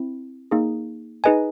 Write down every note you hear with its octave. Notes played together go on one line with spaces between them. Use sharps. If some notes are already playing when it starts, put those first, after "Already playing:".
Already playing: C4 E4
A#3 D#4 G#4
D#4 G#4 B4 D#5 G#5